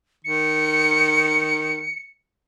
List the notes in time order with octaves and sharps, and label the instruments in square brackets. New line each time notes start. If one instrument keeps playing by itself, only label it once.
[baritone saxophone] D#3 [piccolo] C#7